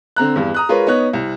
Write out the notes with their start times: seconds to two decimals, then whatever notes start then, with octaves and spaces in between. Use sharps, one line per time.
0.16 D3 C4 A#5 F#6
0.36 E2 G2
0.54 A#5 D#6 F#6
0.69 G#3 F4 A#4 B4 C#5
0.87 B3 D#4 C#5 F#6
1.13 C2